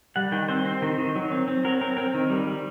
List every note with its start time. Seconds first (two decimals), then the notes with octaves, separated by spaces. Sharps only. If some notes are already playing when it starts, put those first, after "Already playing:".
0.16 G3 F#5
0.32 D#3 G5
0.48 C4 C5
0.65 C4
0.82 D#3
0.98 D#3
1.15 F#3
1.32 C4
1.48 C4
1.65 F#3 A#4
1.81 C4 A#4
1.97 C4 A#4
2.14 D#3
2.30 G3
2.47 G3